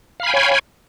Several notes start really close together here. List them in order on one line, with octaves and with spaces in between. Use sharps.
F5 B5 G#5 G5 C#5